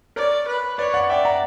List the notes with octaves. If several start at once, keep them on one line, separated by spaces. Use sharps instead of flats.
A#4 C#5 D5
B4
B4 C#5 D5
D5 F#5
D5 E5 G5
F#5 A#5